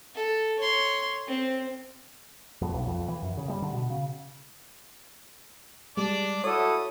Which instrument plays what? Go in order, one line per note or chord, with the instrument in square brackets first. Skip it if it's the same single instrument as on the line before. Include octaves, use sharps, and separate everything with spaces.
[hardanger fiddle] A4
C#5 C6
C4
[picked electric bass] F2
B1
F2
E3
F#2
C#3
G3
D3
B2
C#3
[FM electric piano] G3 G#3 [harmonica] D4 D5
[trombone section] E4 F#4 A4 [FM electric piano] C#5 [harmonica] D#6